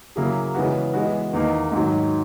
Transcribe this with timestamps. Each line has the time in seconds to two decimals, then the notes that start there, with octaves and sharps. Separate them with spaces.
0.16 C#3 F#3 A#3 E4 G#4
0.55 C#3 E3 G#3 B3 F#4
0.94 E3 G#3 B3 F#4
1.33 E2 D#3 A#3 D#4
1.72 G#2 D#3 F#3